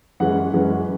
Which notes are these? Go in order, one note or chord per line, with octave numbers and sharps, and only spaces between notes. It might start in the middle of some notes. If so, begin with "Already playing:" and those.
F#2 E3 G#3 C#4 F#5
F#2 E3 G#3 C#4